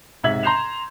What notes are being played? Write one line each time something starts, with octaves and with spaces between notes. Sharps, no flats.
B1 G#2 C3 E5 G#6 F#7
A#5 C6 G6 C7 E7 F7